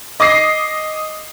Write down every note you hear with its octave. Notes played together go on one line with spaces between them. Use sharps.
D#5 D6 D#6 A#6 C7